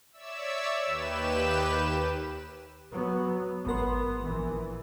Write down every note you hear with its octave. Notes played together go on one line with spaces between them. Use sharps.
C#5 D5 E5 E6
D#2 G4 B4 E7
F#3 B3
G#1 B3 A#4 C6
A#1 E3